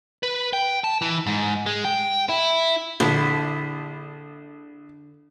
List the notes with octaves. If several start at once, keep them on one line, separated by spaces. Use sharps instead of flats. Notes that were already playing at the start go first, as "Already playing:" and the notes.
B4
G5
A5
E3
G#2
G#3
G5
E4
A#1 D3 E4